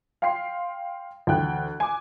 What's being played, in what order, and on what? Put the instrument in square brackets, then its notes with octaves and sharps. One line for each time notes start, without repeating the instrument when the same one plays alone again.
[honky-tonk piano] F5 G5 C6 C7
D2 E3 G5 F#6
G#5 D6